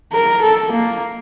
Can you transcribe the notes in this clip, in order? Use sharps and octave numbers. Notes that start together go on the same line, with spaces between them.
A#4
A4
A#3